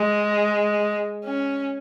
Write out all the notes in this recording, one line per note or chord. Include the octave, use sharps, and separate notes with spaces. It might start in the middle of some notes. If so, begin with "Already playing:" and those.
Already playing: G#3
C#4